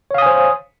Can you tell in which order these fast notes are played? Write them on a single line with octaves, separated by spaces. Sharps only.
C#5 F5 D#6 G#5 C5